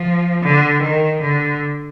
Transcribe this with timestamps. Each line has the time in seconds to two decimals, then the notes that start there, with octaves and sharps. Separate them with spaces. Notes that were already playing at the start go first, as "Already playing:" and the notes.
Already playing: F3
0.42 D3
0.82 D#3
1.21 D3